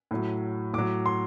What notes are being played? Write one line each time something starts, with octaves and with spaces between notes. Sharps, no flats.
A2 F#3
A2 F#3 D6
C6